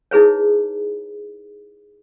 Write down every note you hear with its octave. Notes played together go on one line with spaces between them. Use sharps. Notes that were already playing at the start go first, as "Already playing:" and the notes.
D#4 E4 G#4 B4 C#5